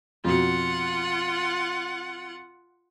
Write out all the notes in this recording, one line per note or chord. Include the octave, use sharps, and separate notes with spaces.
F2 B2 F4 F#5